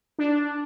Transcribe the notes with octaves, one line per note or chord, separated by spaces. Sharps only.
D4